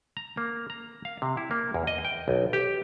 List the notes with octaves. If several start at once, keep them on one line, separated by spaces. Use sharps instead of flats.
A#5
A#3
A#5
F5
C3
E4
A#3
E2
D#5
G5
B1
G4